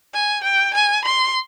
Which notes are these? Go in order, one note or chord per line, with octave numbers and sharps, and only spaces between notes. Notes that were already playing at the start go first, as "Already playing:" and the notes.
G#5
G5
G#5
C6